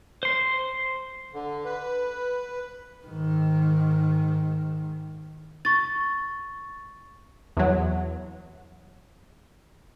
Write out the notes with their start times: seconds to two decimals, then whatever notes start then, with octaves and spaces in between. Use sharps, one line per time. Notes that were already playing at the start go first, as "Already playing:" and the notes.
0.23 C5 C6
1.34 D3
1.65 B4
3.06 G#2 D#3
5.65 C#6 A6
7.57 E2 F#3